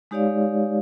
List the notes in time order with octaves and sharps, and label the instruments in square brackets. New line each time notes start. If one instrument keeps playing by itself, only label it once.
[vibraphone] G#3 D#4 G4 C#5 D5 F5